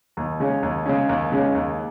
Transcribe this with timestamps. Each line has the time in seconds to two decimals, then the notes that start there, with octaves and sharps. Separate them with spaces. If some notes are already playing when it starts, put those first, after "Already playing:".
0.17 D#2
0.40 C#3 G#3 C#4
0.63 D#2
0.86 C#3 G#3 C#4
1.09 D#2
1.32 C#3 G#3 C#4
1.55 D#2